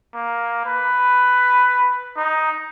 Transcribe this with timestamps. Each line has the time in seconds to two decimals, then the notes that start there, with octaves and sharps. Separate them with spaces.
0.14 A#3
0.65 B4
2.16 D#4